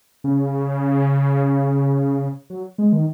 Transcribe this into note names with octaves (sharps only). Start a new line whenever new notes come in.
C#3
F#3
G#3
D#3